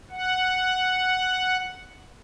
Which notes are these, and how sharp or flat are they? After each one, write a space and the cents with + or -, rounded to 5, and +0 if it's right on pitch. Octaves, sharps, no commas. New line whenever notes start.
F#5 +0